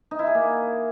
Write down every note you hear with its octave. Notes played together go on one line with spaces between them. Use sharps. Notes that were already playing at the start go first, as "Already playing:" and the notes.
D#4
E4
G#4
A#3